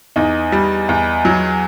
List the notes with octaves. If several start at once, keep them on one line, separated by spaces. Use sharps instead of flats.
E2 D#4
G3
E2
F#3